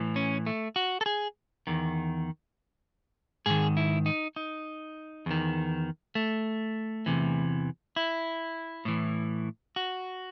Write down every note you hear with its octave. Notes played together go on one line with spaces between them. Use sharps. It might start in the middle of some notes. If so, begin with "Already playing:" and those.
Already playing: A2 E3
C#4
A3
F#4
A4
G#4
E2 D#3
G#2 D#3 G#4
E4
D#4
D#4
E2 D#3
A3
E2 C3 E3
E4
A2 E3
F#4